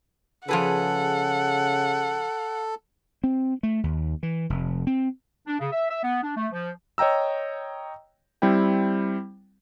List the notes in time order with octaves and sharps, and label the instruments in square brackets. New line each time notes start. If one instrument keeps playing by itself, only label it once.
[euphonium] C#3 [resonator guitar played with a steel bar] F3 G#4 B4 [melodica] A4 [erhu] F#5
[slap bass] C4
A3
D#2
E3
F1
C4
[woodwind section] D4
C#3
E5
E5
B3
D4
A3
F3
[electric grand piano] C#5 D#5 G5 A#5 E6
G3 C4 E4 G5